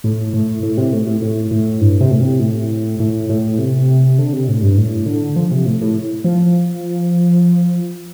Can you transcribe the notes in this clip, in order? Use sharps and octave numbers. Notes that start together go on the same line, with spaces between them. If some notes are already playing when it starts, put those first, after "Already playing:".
A2
A2
A2
C3
A2
A2
A2
A2
G2
C3
A2
C3
A2
A2
A2
C3
D3
C3
A2
G2
A2
D3
F3
C3
A2
A2
F3